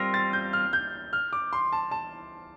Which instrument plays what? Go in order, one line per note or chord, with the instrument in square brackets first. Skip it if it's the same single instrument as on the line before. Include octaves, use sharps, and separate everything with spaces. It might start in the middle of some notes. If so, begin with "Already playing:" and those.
Already playing: [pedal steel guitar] G3 C4 F4 A#4 [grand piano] A#6
[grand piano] A6
G6
F6
G6
F6
D6
C6
A5
A5